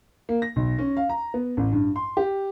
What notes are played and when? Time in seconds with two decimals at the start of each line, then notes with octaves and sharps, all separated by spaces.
0.29 A#3
0.42 A#6
0.56 B1
0.78 C#4
0.97 F5
1.09 A#5
1.34 B3
1.57 A1
1.72 G2
1.96 C6
2.17 G4